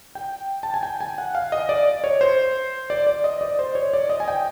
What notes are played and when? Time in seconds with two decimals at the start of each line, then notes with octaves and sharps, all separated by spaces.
0.15 G5
0.63 A5
0.74 G#5
0.83 G5
1.01 G#5
1.18 F#5
1.35 F5
1.52 D#5
1.69 D5
2.04 C#5
2.21 C5
2.90 D5
3.07 D5
3.24 D#5
3.41 D5
3.59 C5
3.75 C#5
3.93 D5
4.10 D#5
4.20 G#5
4.28 G5